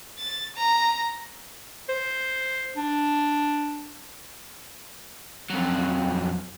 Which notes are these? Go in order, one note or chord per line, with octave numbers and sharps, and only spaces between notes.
A6
A#5
C5
D4
F2 F#3